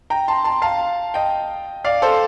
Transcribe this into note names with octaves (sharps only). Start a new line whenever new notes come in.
G5 A#5
A5 C6
A5 C6
F5 A5
D#5 G5
D5 F5
A4 C5